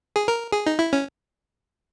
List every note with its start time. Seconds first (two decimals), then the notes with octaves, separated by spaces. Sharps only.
0.16 G#4
0.28 A#4
0.52 G#4
0.66 D#4
0.79 E4
0.93 C#4